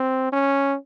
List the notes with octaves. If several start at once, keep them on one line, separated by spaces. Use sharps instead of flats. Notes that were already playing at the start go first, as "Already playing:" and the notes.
Already playing: C4
C#4